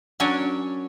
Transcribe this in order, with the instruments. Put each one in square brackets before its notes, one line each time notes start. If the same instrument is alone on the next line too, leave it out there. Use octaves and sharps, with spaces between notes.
[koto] F#3 C#4 D4 A#4 C#5